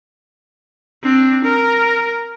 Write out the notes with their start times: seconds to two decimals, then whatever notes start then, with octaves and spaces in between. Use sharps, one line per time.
1.03 C4 D4
1.44 A#4